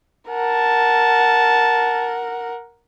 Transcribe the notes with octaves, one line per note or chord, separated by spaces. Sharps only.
A#4 F#5 A5